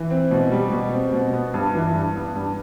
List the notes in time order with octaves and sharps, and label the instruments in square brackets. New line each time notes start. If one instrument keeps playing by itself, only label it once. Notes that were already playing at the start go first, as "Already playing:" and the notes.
Already playing: [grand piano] E3
C4
B2
G3
B2
C4
B2
B3
G2
E3
G2
B3
G2